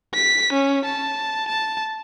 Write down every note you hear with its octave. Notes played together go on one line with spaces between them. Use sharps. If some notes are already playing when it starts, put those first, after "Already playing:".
B6
C#4
A5
A5